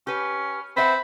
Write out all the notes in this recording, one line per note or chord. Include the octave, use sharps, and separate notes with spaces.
C#4 G4 B4
C4 B4 C5 E5 F#5 B5